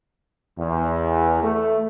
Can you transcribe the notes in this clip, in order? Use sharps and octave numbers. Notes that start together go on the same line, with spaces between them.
E2
A3